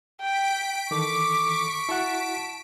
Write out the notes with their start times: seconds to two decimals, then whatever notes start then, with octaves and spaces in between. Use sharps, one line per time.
0.21 G5 B6 D7
0.91 D#3 E3 A4 C#6 D6
1.89 E4 F#4 F#5 A5